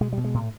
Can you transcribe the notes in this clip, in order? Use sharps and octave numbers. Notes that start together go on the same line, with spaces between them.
B2 G#3
B2 G3
G#3
A2